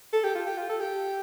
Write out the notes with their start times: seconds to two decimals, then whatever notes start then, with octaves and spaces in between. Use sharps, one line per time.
0.13 A4
0.24 G4
0.35 F4
0.47 G4
0.58 F4
0.69 A4
0.81 G4